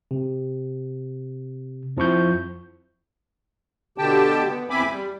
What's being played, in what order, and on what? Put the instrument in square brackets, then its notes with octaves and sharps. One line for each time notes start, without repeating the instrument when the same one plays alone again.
[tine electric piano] C3
F2 F3 E4 C#6 G6
[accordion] B2 D3 G4 G5 A5
B3
E2 C4 E5 G#5 B5 D6
G3